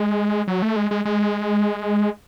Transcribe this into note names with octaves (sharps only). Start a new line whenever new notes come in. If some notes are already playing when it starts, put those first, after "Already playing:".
Already playing: G#3
F#3
A3
G#3
G#3
G#3